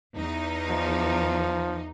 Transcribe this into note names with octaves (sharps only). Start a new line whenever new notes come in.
E2 D#4
F3